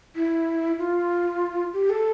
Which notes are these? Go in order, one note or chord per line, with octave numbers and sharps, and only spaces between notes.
E4
F4
G4
A4